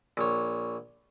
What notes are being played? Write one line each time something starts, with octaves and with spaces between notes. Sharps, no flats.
A#1 C#5